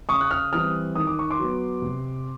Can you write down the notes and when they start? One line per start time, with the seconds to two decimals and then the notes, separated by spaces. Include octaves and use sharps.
0.09 C#3 C#6 D#6
0.21 F#6
0.31 D#6 F6
0.52 E3 G3 C4 D#6 F6
0.95 D#3 D#6
1.07 D6
1.19 C#6
1.30 C6 D6
1.39 F#3 B3
1.82 C3